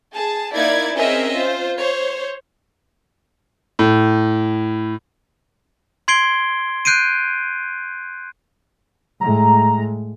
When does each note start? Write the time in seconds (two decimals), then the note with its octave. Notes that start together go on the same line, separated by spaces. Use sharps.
0.14 G#4 A5
0.54 A#3 D#4 E4 D5 G#6
0.95 C4 C#4 G#4 A#4 D#5 E5
1.36 F4 C5
1.78 C5 C#5
3.79 A2
6.08 C6 G#6 C7 D7 G7
6.85 F#6 G6 C7 D7 D#7
9.21 A2 G#3 A#5